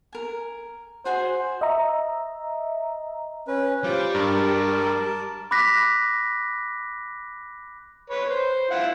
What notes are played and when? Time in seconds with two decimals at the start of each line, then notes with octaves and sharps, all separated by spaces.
0.12 A#4 G#5
1.05 F#4 G#4 C5 G#5
1.61 D#5 E5 A#5
3.48 C#4 B4
3.84 G3 F4 C5 D6
4.15 G2 A#4 A5 D6
5.51 B5 D6 F#6 A#6 B6
8.10 B4 C#5
8.30 C5
8.70 E4 F4 F#5